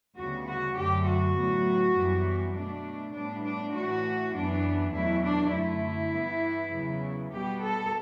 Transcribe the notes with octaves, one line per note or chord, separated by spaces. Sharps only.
D2 C#3 G3 B3 F#4
F#4
F#2 D3 F#3 A3 G4
F#4
A2 F#3 B3
F#2 E3 G3 B3
B2 A3 D4
A2 G3 B3 D4
D4
A2 E3 A3 F#4
F#2 E3 B3 D4
E2 B2 F#3 A3 E4
D4
F#2 D3 A3 E4
G2 E3 B3
E2 C#3 F#3 B3
B2 G3 B3 G4
A4